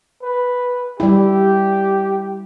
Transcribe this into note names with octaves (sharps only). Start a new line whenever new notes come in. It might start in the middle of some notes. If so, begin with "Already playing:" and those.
B4
G3 E4 G4